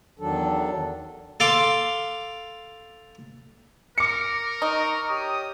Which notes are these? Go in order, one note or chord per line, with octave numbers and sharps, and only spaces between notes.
E2 D#3 F#3 D4 A4
A4 F5 C6 D6
A#4 D6 C#7
D#4 A#5 C#6
G4 C#5 D#6